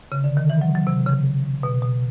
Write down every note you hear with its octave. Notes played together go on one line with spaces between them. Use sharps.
C#3
D3
D#3
E3
F#3
F#3
C3
C#3
B2
B2